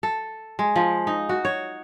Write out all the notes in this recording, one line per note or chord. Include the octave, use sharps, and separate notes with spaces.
A4
G#3
F3
D#4
F#4
C#5